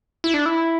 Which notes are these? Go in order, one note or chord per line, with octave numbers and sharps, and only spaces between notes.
E4
D4
E4